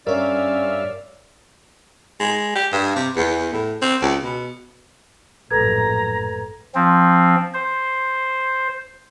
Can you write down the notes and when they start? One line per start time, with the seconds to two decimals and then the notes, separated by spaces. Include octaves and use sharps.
0.07 G2 C#4 A#4 C#5 D5 E5 F5
2.20 G#3
2.56 G4
2.72 G2
2.96 C3
3.16 E2
3.53 A2
3.82 C4
4.02 C#2
4.23 B2
5.51 A#1 F#2 A2 A4 B4 A#5 G#6
6.75 F3 C4
7.54 C5